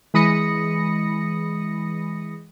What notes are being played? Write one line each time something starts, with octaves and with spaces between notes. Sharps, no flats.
E3 G#3 B5 D#6 A#6 C#7